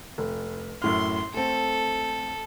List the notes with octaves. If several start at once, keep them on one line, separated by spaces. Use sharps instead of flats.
F1
F#2 A2 C6 F6
A3 C4 A4